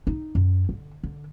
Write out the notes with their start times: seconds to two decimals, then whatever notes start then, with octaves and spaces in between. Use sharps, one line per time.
0.07 D#4
0.35 F#2
0.69 D3
1.03 D3